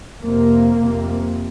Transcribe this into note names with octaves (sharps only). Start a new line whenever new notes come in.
F2 C3 A#3
F2 C3